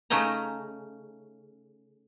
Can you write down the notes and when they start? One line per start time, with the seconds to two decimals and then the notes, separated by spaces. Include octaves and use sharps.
0.10 C#3 A3 C#4 D#4 A#5